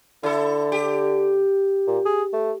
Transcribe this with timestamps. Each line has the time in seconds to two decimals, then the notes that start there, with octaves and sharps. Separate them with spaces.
0.23 D3 E4 A4
0.72 G4
1.87 A#2
2.06 G#4
2.33 A3